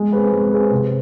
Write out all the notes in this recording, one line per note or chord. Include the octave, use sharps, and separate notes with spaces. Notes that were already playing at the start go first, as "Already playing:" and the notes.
Already playing: G#3
C4 G#4 B4
G#3
C4 G#4 B4
C3